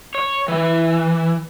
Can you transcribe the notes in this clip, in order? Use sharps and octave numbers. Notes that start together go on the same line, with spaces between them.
C#5
E3